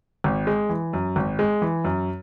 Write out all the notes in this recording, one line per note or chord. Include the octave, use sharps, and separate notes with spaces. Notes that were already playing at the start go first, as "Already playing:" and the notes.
G#1
G#3
E3
F#2
G#1
G#3
E3
F#2